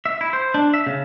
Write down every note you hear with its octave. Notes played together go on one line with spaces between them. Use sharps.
E5
E4
C5
D4
E5
C#3